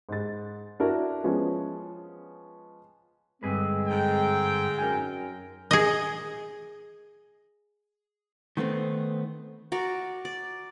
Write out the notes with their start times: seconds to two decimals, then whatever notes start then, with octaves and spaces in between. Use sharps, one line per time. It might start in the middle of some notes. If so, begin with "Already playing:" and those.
0.09 G#2 A6
0.80 D4 E4 F#4 A#4
1.24 F3 G#3 B3 C#4
3.43 G2 D3 G#3 C4 G#4 B4
3.88 G#2 G5
4.79 F#2 A#4 G#5
5.71 G#4 D#5
8.57 D#3 A3 B3 C4
9.72 F#4 A#4 D5
10.25 D5